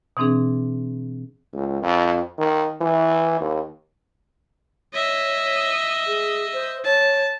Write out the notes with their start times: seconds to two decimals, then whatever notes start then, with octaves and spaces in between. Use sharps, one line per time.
0.17 B2 E3 C4 D4 G#4
1.53 C#2
1.83 F2
2.38 D#3
2.81 E3
3.40 D#2
4.94 C#5 D#5 E5
6.07 G#4
6.53 C5
6.85 C#5 A5